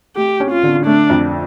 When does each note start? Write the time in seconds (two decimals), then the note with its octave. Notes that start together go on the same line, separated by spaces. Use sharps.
0.16 A3 G4
0.40 C#4
0.51 F4
0.63 D3
0.86 A3 D4
1.10 F2